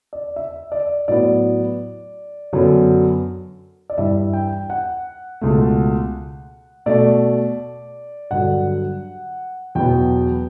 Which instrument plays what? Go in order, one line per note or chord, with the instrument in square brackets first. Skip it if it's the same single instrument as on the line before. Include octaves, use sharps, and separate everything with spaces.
[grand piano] D5
E5
D5
A2 F#3 B3 D5
F#2 D3 F#3 B3
D5
G2 E3 G3 E5
G5
F#5
C#2 B2 A3
B2 A3 D5
G2 D3 F#3 F#5
E2 B2 F#3 B3 G5